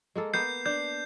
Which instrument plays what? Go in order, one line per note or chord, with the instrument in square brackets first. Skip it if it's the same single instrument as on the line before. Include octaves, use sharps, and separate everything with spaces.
[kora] G#3 A#3 A4
[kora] A#3 B3 [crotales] G6 C7
[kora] D4 [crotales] G6